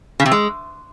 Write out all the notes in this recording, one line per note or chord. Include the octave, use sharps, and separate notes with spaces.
C#3
C3
G#3